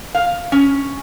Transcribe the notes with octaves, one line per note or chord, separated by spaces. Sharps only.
F5
C#4